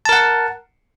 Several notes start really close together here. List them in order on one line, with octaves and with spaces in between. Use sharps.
A5 A#4 F#5